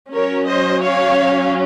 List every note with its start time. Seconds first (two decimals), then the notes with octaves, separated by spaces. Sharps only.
0.11 F#3 C#4 A#4 C#5
0.46 C5 D#5
0.81 C#5 F5